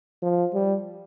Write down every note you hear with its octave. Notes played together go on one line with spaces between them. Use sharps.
F3
G3